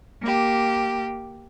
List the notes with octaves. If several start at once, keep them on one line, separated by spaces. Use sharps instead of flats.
A#3 G4